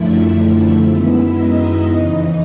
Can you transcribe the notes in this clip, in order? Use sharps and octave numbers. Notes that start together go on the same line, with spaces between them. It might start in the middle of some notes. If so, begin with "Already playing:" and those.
Already playing: F#2 D3 F3 A3 E4 E5
F#2 D#3 G#3 B3 E4 E5
D#4 D#5
F2 C#3 E3 D#4 D#5